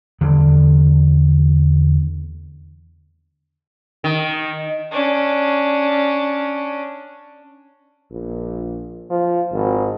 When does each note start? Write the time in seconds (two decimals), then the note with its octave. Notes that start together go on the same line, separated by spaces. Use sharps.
0.21 E2 D3 D#3 G3
4.04 D#3
4.91 C#4 D4
8.11 A#1
9.10 F3
9.53 G#1